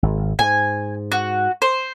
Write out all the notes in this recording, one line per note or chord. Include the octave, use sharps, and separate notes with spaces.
G#1
G#2 G#5
F#4
C5